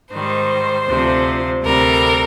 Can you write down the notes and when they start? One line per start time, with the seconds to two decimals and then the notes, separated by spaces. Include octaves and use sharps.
0.12 G#2 D#3 G3 C5
0.89 D2 C3 F3
1.63 D2 C3 G3 A#4